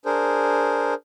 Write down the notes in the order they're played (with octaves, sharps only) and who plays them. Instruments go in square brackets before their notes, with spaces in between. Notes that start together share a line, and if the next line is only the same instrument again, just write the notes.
[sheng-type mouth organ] D4 G#4 A#4 C5